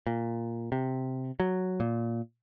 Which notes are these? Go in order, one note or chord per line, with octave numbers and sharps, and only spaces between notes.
A#2
C3
F#3
A#2